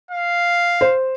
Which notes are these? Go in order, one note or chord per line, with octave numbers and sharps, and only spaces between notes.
F5
C5